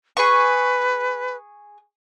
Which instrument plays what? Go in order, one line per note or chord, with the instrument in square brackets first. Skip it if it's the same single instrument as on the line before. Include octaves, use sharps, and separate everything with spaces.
[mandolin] G#4 C#6 [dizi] B4